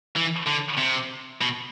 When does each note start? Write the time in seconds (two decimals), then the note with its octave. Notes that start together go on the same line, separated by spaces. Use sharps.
0.16 E3
0.47 D3
0.78 C3
1.41 B2